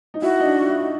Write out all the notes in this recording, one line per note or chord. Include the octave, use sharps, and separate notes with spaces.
D#4
E4 F#4
D#4
D4
F4
E4
D#4